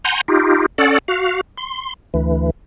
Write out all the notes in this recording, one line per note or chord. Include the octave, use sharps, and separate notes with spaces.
F#5 G#5 A#5 C6 G6
D#4 F4 G4
C#4 A4 D5 F#5
F#4 F5
C6
D2 E3